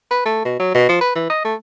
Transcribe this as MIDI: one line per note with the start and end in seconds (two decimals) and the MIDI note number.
0.11 0.20 71
0.25 0.43 57
0.45 0.56 47
0.59 0.73 54
0.75 0.89 47
0.89 0.97 53
1.01 1.11 71
1.15 1.26 52
1.30 1.43 75
1.45 1.54 57